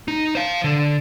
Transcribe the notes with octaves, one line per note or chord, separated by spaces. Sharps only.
D#4
C5 F5
D3